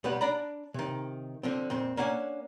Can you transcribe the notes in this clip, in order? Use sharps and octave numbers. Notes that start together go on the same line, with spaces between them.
B1 G3 G4 B4 F#5
D4 D5 A#5 B5
C3 D#3
D3 F3 C4
F2 A#2 C4
A#3 C#4 D4 F#5 G#5